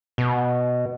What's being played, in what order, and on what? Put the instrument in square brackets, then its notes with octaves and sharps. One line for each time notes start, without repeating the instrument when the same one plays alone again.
[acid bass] B2